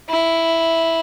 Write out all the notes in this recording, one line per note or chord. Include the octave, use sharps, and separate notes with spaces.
E4